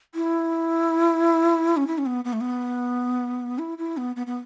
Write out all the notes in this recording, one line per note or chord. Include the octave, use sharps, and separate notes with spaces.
E4
C#4
E4
C#4
B3
B3
A3
B3
E4
E4
B3
B3
B3